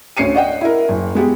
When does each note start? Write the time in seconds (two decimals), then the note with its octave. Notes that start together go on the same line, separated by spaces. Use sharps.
0.17 D2 C#4 C7 C#7 D#7
0.34 D5 D#5 F#5 G5
0.61 E4 A#4
0.89 F#1
1.15 G#3 B3 G4